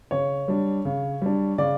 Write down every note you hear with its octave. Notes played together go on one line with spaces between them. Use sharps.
C#3 C#5
G3 D4
C#3
G3 D4
C#3 D5